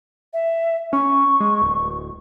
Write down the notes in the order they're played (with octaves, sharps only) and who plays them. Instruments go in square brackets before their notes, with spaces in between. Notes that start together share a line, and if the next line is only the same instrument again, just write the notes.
[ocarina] E5
[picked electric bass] C#4 [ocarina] C#6
[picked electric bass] G#3
D1